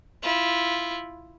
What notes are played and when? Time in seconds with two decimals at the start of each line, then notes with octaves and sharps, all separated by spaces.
0.23 E4 F4